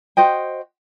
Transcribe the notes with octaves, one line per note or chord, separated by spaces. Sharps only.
F#4 C5 D#5 G5